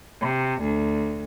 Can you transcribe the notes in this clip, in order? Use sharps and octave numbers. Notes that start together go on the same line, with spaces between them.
C3
D2